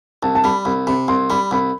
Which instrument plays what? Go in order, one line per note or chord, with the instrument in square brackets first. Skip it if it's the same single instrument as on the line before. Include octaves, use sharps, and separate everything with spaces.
[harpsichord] C2 [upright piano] A5
[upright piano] A5
[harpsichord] G3 [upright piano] B5
[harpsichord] C2 [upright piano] B5
[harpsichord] C3 [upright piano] B5
[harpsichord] C2 [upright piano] C6
[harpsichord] G3 [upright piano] B5
[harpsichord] C2 [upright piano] B5